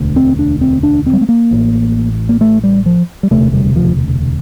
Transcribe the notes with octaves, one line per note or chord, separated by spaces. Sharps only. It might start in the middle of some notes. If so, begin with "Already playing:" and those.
Already playing: E1 D2 D3
C4
D4
C4
D4
C4
G3
A3
A#3
A1 A2
A#3
A3
G3
F3
G3
E1 D2 C3 A3
G3
F3